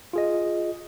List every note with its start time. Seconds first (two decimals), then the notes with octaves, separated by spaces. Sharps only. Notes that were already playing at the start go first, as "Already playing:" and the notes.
0.13 F4 G#4 D#5